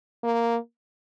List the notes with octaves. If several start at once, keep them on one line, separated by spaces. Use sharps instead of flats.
A#3